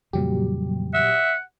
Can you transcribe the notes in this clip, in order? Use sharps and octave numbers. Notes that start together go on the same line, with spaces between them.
F2 A#2 C#3 F#3 G3 G4
E5 F#5